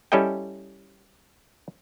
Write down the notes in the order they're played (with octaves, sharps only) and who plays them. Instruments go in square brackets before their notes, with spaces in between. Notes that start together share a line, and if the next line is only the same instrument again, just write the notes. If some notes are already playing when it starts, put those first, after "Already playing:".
[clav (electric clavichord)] G3 C#4 E4 A4 D#5 G5